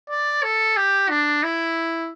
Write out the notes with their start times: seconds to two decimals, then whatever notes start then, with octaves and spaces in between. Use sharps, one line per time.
0.10 D5
0.43 A4
0.77 G4
1.10 D4
1.43 E4